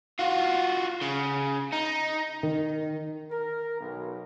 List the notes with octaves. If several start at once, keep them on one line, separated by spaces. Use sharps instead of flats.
F4 F#4
C#3
D#4
D#3
A#4
B1